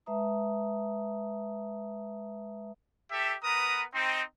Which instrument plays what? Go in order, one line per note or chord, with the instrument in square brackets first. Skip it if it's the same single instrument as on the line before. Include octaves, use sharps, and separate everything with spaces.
[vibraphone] G#3 B4 E5 A5 A#5 D#6
[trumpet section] G4 A4 E5
B3 A#4 B4 A#5 D#6
C4 D#4